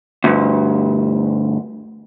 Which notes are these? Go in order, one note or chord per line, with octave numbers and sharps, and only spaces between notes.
D2 G2